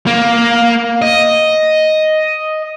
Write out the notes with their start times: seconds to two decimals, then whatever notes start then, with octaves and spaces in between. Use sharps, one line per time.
0.07 A#3
1.02 D#5